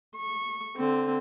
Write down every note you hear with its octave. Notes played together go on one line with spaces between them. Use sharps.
C#6
D3 C4